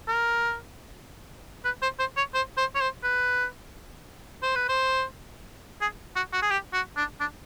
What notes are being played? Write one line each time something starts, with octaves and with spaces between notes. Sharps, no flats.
A#4
B4
C5
C5
C#5
C5
C5
C#5
C5
B4
C5
B4
C5
G#4
F#4
F#4
G#4
G4
F#4
D4
D4